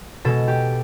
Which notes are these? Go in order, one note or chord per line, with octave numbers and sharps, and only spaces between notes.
B2 G#3 A4
G4